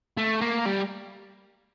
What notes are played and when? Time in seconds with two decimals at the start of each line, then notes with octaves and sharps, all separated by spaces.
0.18 A3
0.41 A#3
0.66 G3